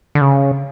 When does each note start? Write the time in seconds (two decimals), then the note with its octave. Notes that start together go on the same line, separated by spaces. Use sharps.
0.15 D3
0.21 C#3